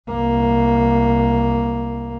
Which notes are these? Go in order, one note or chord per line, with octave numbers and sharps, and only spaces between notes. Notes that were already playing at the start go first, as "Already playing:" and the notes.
C2 A#3